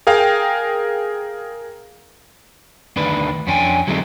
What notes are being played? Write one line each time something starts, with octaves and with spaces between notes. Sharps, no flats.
G#4 A#4 F5 G5
D2 D#3 D4 B4
F2 B3 C#4 D4 G5 G#5
D3 F#3 G#3 A3 C4 D#4